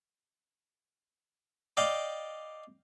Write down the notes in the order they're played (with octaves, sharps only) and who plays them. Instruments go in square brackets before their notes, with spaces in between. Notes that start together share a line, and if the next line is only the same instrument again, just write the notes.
[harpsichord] D5 D#5 F5 G5 D6